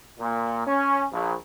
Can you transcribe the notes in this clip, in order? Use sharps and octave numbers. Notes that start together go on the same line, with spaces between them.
A#2
C#4
A#1